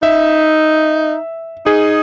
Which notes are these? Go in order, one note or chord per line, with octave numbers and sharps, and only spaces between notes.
D#4 E5
D#4 G#4